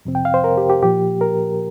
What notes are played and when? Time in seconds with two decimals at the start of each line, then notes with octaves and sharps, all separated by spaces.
0.05 F2 C3 F3 C4
0.15 G5
0.25 F5
0.34 C5
0.44 A#4
0.58 G4
0.70 G4
0.82 A#2 F3 A#3 G4
1.21 A#4